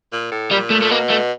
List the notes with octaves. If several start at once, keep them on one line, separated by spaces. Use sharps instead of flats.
A#2
A2
A#2 G3
A3
A3
B2 A#3
A3